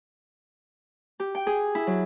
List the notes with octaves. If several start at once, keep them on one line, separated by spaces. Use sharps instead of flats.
G4
G5
G#4
E4
F#3